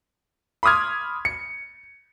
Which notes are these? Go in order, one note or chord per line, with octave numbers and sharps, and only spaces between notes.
B5 C6 D6 D#6 F6 G#6
C#7